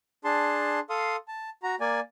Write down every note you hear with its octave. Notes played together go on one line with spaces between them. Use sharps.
D4 G#4 A5 C6
A4 F5 C6 D#6
A5
F#4 A#5
A#3 D5 G#5